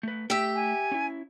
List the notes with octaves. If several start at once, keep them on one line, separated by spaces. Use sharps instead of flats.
A3 B4
A3 G4 E5 G5
G#5
C#4 E4